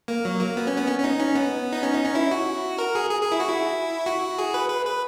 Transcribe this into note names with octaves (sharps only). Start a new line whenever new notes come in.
A#3
F#3
A#3
B3
C#4
B3
C#4
C#4
D#4
C#4
B3
D#4
C#4
D#4
C#4
E4
F#4
A#4
G#4
G#4
G#4
E4
F#4
E4
F#4
G#4
B4
B4
B4